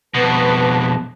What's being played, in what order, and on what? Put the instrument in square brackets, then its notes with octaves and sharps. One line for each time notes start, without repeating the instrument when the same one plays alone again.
[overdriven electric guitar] F2 B2 [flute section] B4 A5